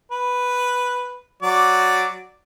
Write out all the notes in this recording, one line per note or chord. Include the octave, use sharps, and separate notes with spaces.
B4
F#3 F#4 D5